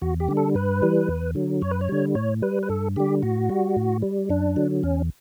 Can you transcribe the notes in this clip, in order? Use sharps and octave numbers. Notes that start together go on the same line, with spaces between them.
E2 F#4
G4
D3 G3
A4
G2 B4
E3 G3
E2
D3 F#3
F#2 C#5
B4
C#5
D3 G3
A2 C#5
G3 B4
B4
G2 A4
D3 G3 G4
A2 F#4
G3
A2
G3
F#2 D4
D3 F#3
E2 C#4